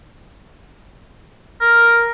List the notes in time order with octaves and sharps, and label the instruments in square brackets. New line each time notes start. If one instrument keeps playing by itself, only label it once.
[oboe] A#4